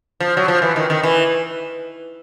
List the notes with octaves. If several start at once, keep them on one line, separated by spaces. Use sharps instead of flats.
F3
F#3
F3
E3
D#3
D#3
E3